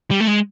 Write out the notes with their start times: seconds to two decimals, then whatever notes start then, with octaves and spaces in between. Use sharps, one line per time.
0.11 G3
0.20 A3
0.27 G#3